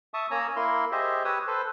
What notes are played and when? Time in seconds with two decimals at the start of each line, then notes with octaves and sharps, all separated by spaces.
0.14 E5 A5 C#6 D#6
0.31 A#3 C#4 C#5 A#5 D#6 E6
0.56 A#3 E4 A#4 C6
0.92 G4 G#4 C5 D#5 E5
1.25 G4 B4 C#5 D#6 E6
1.47 A4 B4 C5